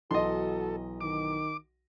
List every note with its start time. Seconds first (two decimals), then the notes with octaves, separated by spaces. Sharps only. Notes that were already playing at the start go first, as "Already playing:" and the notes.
0.11 B1 E3 F#4 A4 D#5 C6
1.01 D#3 D6